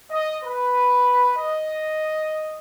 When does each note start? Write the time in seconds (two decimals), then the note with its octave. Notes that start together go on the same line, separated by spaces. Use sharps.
0.11 D#5
0.44 B4
1.37 D#5